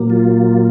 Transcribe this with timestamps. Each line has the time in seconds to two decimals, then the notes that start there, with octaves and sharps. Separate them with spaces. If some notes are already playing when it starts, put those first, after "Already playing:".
Already playing: A#2 F#3 A#3
0.10 F4